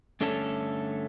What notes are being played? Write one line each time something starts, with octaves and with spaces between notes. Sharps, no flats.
G2 D3 A3 C#4 A4